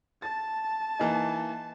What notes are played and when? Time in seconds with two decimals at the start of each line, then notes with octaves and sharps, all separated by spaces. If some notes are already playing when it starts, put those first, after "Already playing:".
0.22 A5 A6
0.99 E3 A#3 D#4